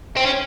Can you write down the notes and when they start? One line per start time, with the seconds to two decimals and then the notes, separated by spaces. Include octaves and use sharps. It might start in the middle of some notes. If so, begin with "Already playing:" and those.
0.17 C4
0.25 C#4